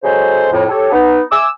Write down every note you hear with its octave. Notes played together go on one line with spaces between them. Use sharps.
C#3 F#3 G#3 A4 C5
F2 A2
G4 A4 C#5
B3 D#4
E5 G#5 D6 E6